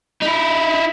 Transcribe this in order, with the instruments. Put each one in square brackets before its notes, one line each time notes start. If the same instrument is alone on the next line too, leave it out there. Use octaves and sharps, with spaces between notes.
[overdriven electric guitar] D#4 E4